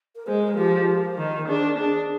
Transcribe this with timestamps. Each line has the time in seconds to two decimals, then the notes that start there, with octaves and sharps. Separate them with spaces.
0.16 A#4
0.27 G#3 C5
0.42 A#4
0.57 F3 G4
0.88 A#4
1.18 D#3
1.48 D4 G#4
1.57 C5
1.67 A#4
1.78 D4 G#4